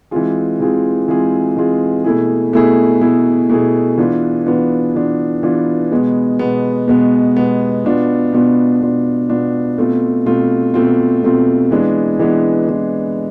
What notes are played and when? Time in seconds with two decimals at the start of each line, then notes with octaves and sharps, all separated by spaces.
0.11 E3 G#3 C4 F4 G#4
0.60 E3 G#3 C4 F4 G#4
1.08 E3 G#3 C4 F4 G#4
1.56 E3 G#3 C4 F4 G#4
2.04 B2 A3 E4 G#4
2.53 B2 A3 E4 G#4
3.01 B2 A3 E4 G#4
3.50 B2 A3 E4 G#4
3.98 E3 B3 D4 F4
4.46 E3 B3 D4 F4
4.94 E3 B3 D4 F4
5.43 E3 B3 D4 F4
5.91 B2 G#3 B3
6.39 B2 G#3 B3
6.88 B2 G#3 B3
7.36 B2 G#3 B3
7.85 B2 B3 D4 F4
8.33 B2 B3 D4 F4
8.81 B2 B3 D4 F4
9.30 B2 B3 D4 F4
9.78 B2 A3 C4 F4
10.26 B2 A3 C4 F4
10.74 B2 A3 C4 F4
11.23 B2 A3 C4 F4
11.71 E3 G#3 B3 D4
12.19 E3 G#3 B3 D4
12.68 E3 G#3 B3 D4